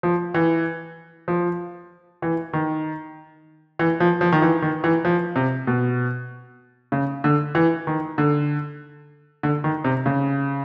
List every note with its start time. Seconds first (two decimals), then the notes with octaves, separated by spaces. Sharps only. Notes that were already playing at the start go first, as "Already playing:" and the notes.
0.03 F3
0.34 E3
1.28 F3
2.22 E3
2.53 D#3
3.79 E3
4.00 F3
4.21 F3
4.32 D#3
4.42 E3
4.62 D#3
4.84 E3
5.05 F3
5.36 C3
5.67 B2
6.92 C#3
7.24 D3
7.55 E3
7.87 D#3
8.18 D3
9.43 D3
9.64 D#3
9.85 C3
10.06 C#3